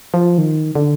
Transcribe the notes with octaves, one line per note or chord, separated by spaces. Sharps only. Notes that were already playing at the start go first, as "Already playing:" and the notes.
F3
D#3
D3